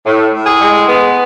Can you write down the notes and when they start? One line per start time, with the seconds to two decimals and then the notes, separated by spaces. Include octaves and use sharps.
0.05 A2
0.33 A2
0.46 G#4
0.60 G#3
0.87 B3